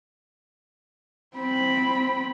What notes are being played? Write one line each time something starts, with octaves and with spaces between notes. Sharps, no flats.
C4 B5